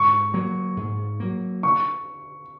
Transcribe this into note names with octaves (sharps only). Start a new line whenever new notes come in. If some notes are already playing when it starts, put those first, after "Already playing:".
Already playing: G#2 C#6
F#3 A#3
G#2
F#3 A#3
C#6